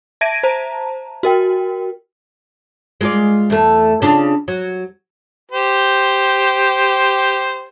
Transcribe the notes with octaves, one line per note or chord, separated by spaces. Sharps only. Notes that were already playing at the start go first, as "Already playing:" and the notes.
E5 A5 G#6 A#6 D7 D#7
C5 A5 A#5
F#4 A#4 G5
G#3 F4 D5
E2 A3
C#3 D4 F4
F#3
G4 C5